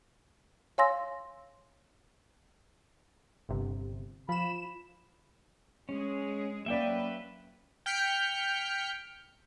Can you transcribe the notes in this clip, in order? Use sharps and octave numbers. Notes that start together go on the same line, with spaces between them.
C#5 F5 G#5 C6 E6 A#6
G1 C3
F3 B5 E7
G#3 C#4 G#4
F#3 A#3 C#4 B4 D5 E5 G5
G5 F6 G6 B6 C#7